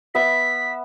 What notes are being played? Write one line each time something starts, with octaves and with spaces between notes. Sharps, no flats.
B3 E5 B6